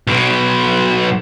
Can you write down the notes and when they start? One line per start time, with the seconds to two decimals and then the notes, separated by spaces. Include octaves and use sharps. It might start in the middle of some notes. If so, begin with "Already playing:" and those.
0.07 B1 B2